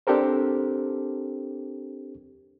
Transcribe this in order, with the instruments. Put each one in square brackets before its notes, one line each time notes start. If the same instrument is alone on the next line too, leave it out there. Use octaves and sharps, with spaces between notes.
[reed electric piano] C4 D4 G4 A4 A#4 C5